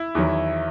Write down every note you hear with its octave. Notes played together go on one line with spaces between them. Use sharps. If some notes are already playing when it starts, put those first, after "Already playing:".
Already playing: E4
E2 D#3 F#3